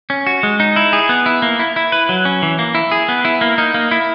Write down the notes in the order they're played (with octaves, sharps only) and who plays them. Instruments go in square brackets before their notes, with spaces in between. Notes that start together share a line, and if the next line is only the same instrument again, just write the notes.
[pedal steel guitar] C#4
F#4
G#3
D#4
E4
G#4
B3
E4
A#3
E4
E4
B4
F#3
C#4
E3
A#3
E4
G#4
B3
E4
A#3
D#4
A#3
E4